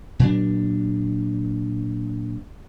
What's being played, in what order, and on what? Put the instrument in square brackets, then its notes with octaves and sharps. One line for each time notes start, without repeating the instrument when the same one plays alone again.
[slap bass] A#2 F#3 D4